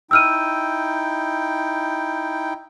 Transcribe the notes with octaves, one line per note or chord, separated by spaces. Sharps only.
D#4 E4 G5 E6 F6 D#7